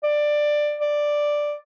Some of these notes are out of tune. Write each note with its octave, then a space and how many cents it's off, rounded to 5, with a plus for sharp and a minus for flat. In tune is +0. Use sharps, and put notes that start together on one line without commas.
D5 +15
D5 +5